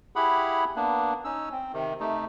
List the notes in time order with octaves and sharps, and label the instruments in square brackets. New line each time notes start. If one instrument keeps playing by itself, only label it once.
[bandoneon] E4 G4 G#4 F#5 B5
A#3 B3 D4
C#4 D#4 E6
C4
C3 D#3
C3 A3 D#4